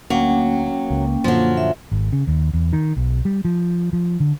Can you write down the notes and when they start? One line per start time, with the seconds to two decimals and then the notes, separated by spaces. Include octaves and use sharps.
0.10 D2 F#3 A#3 C#4 G5
0.90 C#2
1.24 F#2 A#2 D3 F3 F#3
1.57 E5
1.92 G#1
2.12 C#3
2.27 D#2
2.53 E2
2.73 D#3
2.96 B1
3.25 G3
3.45 F3
3.93 F3
4.20 D3